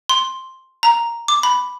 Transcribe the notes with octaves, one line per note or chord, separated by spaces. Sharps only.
C6
A#5
D6
B5